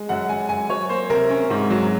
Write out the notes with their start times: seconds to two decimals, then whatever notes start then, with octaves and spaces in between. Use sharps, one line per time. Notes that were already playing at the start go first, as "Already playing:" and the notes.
Already playing: G#3
0.09 F#2 F#5
0.29 F#2 G#5
0.49 F#2 G#5
0.69 F#3 C#5
0.89 A#3 C5
1.10 C3 A#4
1.30 C#4
1.50 G#2
1.70 F#3